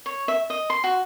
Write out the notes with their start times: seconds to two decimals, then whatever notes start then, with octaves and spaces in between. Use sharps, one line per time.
0.06 C#5
0.28 E5
0.50 D#5
0.70 C6
0.84 F#4